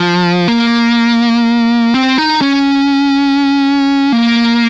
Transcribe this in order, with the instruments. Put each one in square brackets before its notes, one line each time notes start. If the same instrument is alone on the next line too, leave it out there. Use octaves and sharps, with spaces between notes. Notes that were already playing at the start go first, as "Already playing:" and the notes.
Already playing: [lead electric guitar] F3
A#3
C4
D#4
C#4
A#3